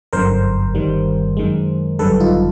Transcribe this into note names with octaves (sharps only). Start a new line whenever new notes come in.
G1 F#2 D3 A#4 C5
G1 G2 D#3 G3
F#2 D#3 G#3
G#1 F#2 D3 G3 A4 B4
D#4 F4